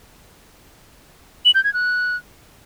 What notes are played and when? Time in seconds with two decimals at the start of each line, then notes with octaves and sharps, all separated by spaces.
1.45 F#7
1.55 G6
1.64 G#6
1.74 F#6